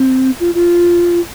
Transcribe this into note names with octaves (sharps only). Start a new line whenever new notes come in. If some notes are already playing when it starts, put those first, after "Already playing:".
Already playing: C4
F4
F4